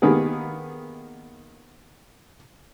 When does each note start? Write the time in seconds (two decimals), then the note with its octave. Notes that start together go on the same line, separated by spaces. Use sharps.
0.02 D#3 A#3 B3 G4 G#4